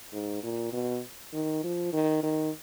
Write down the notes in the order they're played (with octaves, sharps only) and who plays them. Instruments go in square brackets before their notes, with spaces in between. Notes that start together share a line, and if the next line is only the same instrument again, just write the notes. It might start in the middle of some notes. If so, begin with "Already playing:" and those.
[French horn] G#2
A#2
B2
D#3
F3
D#3
D#3